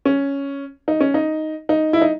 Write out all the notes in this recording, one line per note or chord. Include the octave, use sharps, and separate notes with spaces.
C#4
D#4
C#4
D#4
D#4
E4
D#4